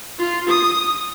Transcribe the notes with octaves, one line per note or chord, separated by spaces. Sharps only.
F4
D#6